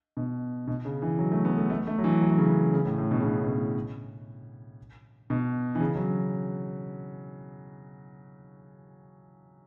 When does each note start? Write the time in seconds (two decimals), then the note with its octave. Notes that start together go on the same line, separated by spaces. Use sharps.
0.17 B2
0.67 B2
0.85 C#3
1.02 E3
1.19 F#3
1.32 A3
1.45 B3
1.58 A3
1.70 A3
1.87 A3
1.98 F#3
2.04 E3
2.22 F#3
2.30 E3
2.38 C#3
2.46 E3
2.73 C#3
2.85 A2
2.98 A2
3.11 B2
3.20 C#3
3.25 B2
3.43 B2
3.51 A2
5.30 B2
5.75 E3
5.80 C#3
5.96 F#3